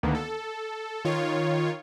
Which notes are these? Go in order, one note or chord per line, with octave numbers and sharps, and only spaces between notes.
D2 D3 D#3 A#3 B3
A4
D#3 F4 C#5